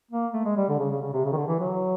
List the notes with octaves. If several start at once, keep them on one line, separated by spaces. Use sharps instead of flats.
A#3
A3
G#3
G3
D3
C#3
C#3
C#3
C3
C#3
D#3
D3
E3
F#3